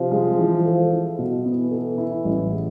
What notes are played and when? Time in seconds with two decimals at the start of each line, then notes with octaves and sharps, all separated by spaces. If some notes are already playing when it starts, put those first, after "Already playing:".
Already playing: C3 F3
0.12 G#3
0.39 E3
0.65 A4
0.92 E4
1.19 B2
1.45 E3 B3
1.71 A4
1.98 E4
2.25 A1
2.51 G#3